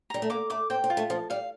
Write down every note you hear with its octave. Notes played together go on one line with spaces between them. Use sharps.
G3 A#5
A3
A#3 D6
A3 D6
C4 G5
C4
F4
A3
F3 A5
G3 F5